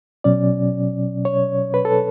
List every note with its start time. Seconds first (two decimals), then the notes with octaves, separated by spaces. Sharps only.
0.24 B2 F#3 C#4 D5
1.25 C#5
1.74 B4
1.85 A4